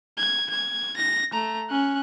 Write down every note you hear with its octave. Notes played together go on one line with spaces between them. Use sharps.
G#6
G#6
A#6
A3 A#5
C#4 F#6